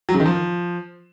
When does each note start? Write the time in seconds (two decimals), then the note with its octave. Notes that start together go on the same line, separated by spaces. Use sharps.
0.09 F#3
0.14 C#3
0.20 D#3
0.26 F3